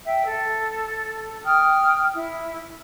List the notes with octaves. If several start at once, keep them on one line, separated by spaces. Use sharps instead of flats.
E5 G5
A4
G5 D#6 F6
E4